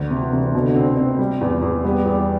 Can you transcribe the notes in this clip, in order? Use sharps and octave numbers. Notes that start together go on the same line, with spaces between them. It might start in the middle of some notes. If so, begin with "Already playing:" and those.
Already playing: D2
C3
E3
C3
B2 D3
C4
C4
G3
E2
E2
G3 B3
E2